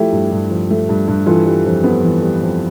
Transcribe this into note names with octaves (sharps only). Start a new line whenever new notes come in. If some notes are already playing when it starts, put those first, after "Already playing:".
Already playing: F3 A3 E4 G4
G2
G2
F3
A3
G2
G2
E3 F4 A4
G3
F2
B3
E3
G3
F2